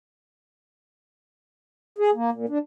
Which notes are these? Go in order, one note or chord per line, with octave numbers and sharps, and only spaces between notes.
G#4
A#3
A#2
D4